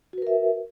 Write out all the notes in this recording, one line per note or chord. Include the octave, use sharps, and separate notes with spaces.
F#4 A#4 B4 E5